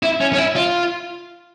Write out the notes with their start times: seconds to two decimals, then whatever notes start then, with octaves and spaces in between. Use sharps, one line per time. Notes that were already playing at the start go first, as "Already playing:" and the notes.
0.03 E4
0.21 C#4
0.33 C#4
0.38 E4
0.56 F4